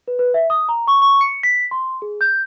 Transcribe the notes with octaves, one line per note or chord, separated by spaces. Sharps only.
B4
B4
E5
D#6
A#5
C#6
C#6
C#7
B6
C6
G#4
G6